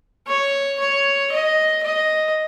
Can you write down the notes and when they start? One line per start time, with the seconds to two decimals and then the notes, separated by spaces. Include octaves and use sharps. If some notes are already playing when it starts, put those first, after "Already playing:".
0.27 C#5
0.79 C#5
1.32 D#5
1.83 D#5